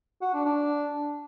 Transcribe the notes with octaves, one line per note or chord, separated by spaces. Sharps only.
F#4
D4
D4